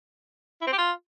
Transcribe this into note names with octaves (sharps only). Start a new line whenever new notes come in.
E4
C4
G4
F4